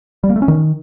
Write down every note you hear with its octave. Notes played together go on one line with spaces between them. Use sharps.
G3
A#3
A3
C#4
D#3